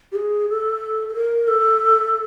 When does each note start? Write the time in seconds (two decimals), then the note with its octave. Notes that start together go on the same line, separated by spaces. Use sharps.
0.12 G4
0.16 G#4
0.49 A4
1.09 A4
1.14 A#4
1.48 A4